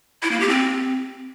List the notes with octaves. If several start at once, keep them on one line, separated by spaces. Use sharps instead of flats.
E4
A#3
G4
C4